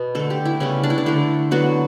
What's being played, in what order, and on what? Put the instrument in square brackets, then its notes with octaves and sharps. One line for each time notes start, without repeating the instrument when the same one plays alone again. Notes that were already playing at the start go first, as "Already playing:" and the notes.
Already playing: [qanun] B2 B3
D3 A3 A4
G4
E4
C#3 G3 B3 C#4
D4
E4
D4
D3 A3 E4
D3 F#3 B3 F#4